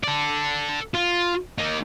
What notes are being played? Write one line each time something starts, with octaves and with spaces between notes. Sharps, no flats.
A4 D5
F4
A#3 D#4